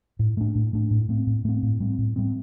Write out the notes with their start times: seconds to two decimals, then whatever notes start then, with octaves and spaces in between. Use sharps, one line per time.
0.19 A2
0.37 A3 D4
0.55 A2
0.73 A3 D4
0.91 A2
1.09 A3 C4
1.27 A2
1.45 A3 C4
1.62 A2
1.80 G3 C4
1.98 A2
2.16 G3 C4